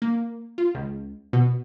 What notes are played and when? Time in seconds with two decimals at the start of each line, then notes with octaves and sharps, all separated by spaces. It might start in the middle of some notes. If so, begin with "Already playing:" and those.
0.02 A#3
0.58 F4
0.75 C#2
1.33 B2